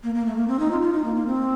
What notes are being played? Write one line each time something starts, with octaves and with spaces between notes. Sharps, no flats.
A#3
A#3
A3
A#3
C4
D#4
F4
F4
D#4
A#3
A#3
C4